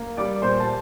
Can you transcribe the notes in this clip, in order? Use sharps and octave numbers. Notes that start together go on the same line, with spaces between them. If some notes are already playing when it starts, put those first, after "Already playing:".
Already playing: A#3
G3 D5 D6
A#2 C5 C6
A5